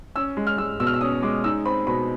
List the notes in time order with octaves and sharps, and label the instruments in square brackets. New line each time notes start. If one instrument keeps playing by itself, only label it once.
[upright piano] C#4 E6
G#3
F6
G#3 E6
B2 E6
F6
E6
C#4 D#6
G#3 D6
D#4 E6
C4 B5
B2 B5